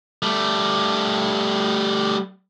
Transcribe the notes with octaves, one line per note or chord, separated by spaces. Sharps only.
G3 A3